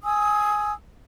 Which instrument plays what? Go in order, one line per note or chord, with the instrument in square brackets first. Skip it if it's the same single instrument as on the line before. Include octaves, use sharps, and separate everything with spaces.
[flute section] G#5 D#6 E6